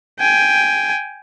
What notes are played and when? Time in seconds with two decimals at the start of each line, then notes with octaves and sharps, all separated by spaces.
0.20 G5 G#5